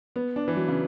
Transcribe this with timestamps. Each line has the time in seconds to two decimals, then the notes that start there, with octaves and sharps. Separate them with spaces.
0.16 B3
0.36 D4
0.48 E3
0.56 F#3
0.68 C#3